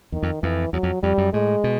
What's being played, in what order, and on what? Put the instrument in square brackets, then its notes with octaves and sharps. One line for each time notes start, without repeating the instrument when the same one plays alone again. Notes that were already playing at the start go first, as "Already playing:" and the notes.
[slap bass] E2 [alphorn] D#3
[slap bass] F2
[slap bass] F2 [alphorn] E3
[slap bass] E2 [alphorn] F#3
[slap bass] F2
[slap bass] F2 [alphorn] G3
[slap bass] F#2
[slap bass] A2 [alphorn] G#3
[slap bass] B2